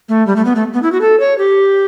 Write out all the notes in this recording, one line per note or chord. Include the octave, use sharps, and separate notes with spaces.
A3
G3
A3
B3
A3
B3
E4
F#4
A4
C#5
G4